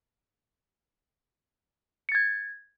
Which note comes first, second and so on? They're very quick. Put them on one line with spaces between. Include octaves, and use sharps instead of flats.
C#7 A6 G#6